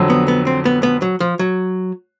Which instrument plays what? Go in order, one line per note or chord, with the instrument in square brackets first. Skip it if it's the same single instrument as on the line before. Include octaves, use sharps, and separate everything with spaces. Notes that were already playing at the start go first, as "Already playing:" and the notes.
Already playing: [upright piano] F2 D3 F#3
[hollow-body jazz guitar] B3
B3
C4
B3
B3
F#3
F3
F#3